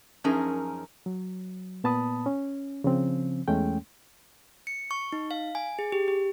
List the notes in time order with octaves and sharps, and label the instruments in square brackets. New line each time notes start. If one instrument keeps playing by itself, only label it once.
[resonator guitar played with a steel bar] F#2 F3 C#4 D#4 G#4 A#4
[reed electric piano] F#3
A#2 B3 A5 B5 D#6
C#4
C#3 F3 C4
E2 G#3 A3 C#4 G5
[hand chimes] C#7
C#6
D#4
F5
G#5
G#4
G4
G4